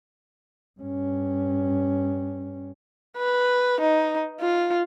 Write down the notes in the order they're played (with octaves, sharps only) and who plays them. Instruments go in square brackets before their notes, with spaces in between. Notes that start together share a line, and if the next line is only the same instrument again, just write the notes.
[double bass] G2 C#4
[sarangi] B4
D#4
F4